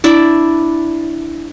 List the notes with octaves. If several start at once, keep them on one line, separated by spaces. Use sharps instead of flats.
D4 E4 D5